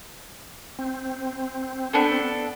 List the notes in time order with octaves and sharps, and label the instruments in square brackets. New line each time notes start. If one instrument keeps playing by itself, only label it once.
[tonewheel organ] C4
[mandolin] B3 D4 A4